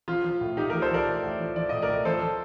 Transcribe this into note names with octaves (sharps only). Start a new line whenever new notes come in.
F3 F4
F3
A2
A2 D#4 G4
F3 G4 A#4
A4 C5
F3 A#4 D5
A2
A2
F3
F3 D5
A2 D#5
A#4 D5
A2
F3 A4 C5
F3